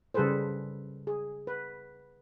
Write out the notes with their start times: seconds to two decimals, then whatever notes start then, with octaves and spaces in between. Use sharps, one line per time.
0.14 C#3 G3 G#4 A4 B4 C5
1.07 G#4
1.47 B4